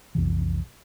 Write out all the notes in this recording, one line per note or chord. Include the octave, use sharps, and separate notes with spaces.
B1 F2 C3 E3